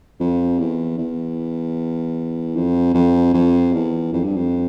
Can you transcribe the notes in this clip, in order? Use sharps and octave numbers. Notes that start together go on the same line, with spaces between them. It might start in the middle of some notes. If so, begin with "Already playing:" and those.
F2
E2
E2
F2
F2
F2
E2
F2
G2
F2